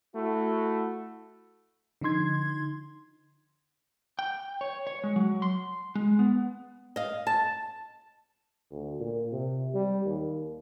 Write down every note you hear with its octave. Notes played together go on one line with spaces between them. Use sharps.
A3 E4 F#4
D3 F3 D#4 C6 G#6
G5
C#5
C#5
G#3
F#3
C6
G#3
B3
D#5 F5
A5
D2
A#2
C3
G3
D#2